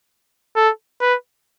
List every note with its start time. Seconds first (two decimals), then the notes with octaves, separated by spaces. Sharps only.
0.56 A4
1.01 B4